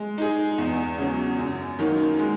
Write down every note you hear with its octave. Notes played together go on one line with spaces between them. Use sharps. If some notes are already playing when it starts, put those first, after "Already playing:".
Already playing: G#3
D#4 G#4
E2
C#3 F#3
F#2
D#3 F#3 A#3 D#4
G#3